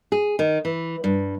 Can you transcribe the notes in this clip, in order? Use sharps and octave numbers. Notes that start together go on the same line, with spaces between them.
G#4
D#3
E3
G2